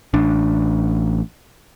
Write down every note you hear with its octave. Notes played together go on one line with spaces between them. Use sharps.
A1 D4